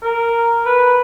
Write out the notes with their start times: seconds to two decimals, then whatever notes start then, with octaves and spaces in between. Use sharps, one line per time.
0.03 A#4
0.66 B4